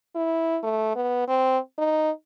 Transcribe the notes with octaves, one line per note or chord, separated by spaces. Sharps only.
E4
A3
B3
C4
D#4